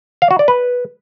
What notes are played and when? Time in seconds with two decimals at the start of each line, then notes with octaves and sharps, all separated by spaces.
0.22 F5
0.31 F#4
0.39 D5
0.48 B4